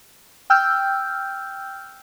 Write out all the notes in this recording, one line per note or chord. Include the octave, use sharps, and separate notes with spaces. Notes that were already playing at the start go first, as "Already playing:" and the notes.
G5 E6 F6 G6